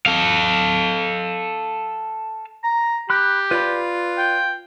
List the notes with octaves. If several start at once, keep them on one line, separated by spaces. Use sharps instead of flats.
A4 F5
A#5
G4 B5 F#6
F4 B4 D5 B5
G5